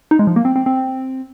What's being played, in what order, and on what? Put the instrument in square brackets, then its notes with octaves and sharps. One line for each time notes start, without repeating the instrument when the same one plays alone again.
[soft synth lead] D#4
G#3
F3
A#3
C4
C4
C4